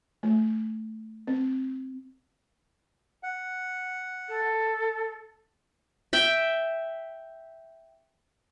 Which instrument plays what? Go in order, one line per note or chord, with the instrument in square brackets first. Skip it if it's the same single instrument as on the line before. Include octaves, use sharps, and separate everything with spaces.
[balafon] A3
C4
[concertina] F#5
[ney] A4
[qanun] E5 G5